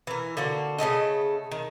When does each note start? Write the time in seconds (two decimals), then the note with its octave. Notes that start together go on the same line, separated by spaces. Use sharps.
0.07 E3 A#4
0.37 D3 A#3 F#4
0.79 C#3 G#3 A3 D#5
1.51 D#3